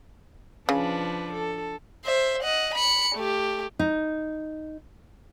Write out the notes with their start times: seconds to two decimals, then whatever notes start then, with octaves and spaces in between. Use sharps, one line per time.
0.69 C#3 F3 D4 B4
1.33 A4
2.05 C5 E5
2.42 D#5 F#5
2.74 B5 C#7
3.15 A3 G4
3.79 D#4